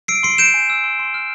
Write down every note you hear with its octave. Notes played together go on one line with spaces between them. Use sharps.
E6 C7 D7
C6 C7 D7
G6 D7 E7
G#5
E6
C6
C6
F6